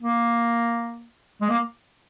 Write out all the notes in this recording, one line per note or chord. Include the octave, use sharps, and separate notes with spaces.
A#3
G#3
A#3